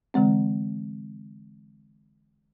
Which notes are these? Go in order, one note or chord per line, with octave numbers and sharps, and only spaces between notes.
D3 E3 G#3 C4